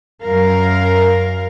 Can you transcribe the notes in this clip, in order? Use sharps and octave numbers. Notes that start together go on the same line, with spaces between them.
F#2 A#4 F5